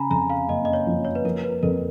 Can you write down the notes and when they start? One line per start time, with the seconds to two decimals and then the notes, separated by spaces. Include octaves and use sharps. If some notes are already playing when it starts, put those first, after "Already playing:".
Already playing: C#3 G#5 A#5 B5
0.10 F2 A#5
0.30 F5
0.48 F#1 D#5
0.65 D#5
0.73 C#5
0.87 F3
1.05 C#5
1.15 B4
1.25 F3 A#4
1.44 B4
1.63 F2 A#4